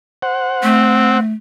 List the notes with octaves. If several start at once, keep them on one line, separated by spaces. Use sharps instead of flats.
C5 F#5
A3 C4